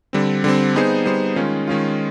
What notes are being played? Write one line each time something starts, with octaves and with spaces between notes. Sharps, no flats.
D3 G3 C4
D3 G3 C4
G3 B3 D#4 G#4 C5
G3 B3 D#4 G#4 C5
D#3 G#3 C#4 F4
D#3 G#3 C#4 F4